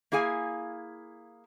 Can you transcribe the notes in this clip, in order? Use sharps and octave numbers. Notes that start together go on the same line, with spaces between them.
A#3 E4 G#4 F5 G#5